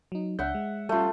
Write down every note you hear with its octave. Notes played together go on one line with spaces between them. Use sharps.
F#3 D#4
C#2 D4 E5 F#5 G6
G#3
G3 A3 C#4 F4